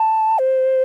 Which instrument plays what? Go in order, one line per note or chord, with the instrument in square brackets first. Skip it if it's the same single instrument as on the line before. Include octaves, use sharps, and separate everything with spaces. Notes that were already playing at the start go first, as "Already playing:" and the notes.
Already playing: [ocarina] A5
C5